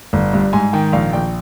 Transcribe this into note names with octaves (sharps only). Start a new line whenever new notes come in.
G1
G2
G#2 G#5
D#3 G5
A#1 F5
A#1 G5